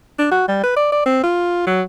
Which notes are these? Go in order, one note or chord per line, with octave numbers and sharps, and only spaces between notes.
D4
F#4
G3
B4
D5
D5
C4
F4
F#3